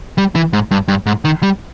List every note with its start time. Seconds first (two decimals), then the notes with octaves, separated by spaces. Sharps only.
0.18 G3
0.35 E3
0.53 G#2
0.71 G2
0.88 G2
1.06 G#2
1.25 D#3
1.43 G3